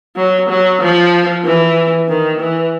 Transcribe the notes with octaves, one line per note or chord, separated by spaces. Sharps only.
F#3
F#3
F3
E3
D#3
E3